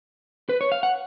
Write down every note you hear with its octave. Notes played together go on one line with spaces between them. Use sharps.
B4
C#5
F5
F#5